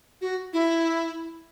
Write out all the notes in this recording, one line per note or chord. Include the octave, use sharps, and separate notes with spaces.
F#4
E4